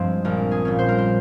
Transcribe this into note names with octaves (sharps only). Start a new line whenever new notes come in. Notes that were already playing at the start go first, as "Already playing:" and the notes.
Already playing: G2 F3 G#3 C4
A#1 A#4
G#4
A#2 G3 C#4
C5
A#4
C5